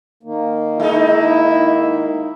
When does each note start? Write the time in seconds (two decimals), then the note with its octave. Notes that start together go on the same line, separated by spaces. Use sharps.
0.23 D#3 A#3
0.80 G#3 D#4 E4